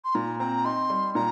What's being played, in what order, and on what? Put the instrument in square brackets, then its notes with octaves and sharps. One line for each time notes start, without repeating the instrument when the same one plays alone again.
[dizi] C6
[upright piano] A#2 [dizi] A#5
[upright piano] C4 [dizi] A#5
[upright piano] D#4 [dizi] C6
[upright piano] G3
[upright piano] A#2 [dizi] A#5